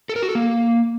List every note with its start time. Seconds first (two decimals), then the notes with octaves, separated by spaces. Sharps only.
0.09 A4
0.16 A#4
0.22 F#4
0.29 A4
0.35 A#3